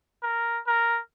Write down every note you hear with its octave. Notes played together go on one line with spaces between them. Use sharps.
A#4
A#4